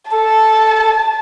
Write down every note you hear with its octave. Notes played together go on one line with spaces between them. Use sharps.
A4 A5